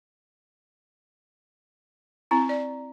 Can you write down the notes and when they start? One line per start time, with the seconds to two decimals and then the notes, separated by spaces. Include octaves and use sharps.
2.31 C4 E4 A#5
2.49 D5